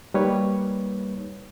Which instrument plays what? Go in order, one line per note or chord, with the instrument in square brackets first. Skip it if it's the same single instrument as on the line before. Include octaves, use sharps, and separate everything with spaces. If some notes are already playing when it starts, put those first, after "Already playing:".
[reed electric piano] G3 A#3 D#4 B4 C#5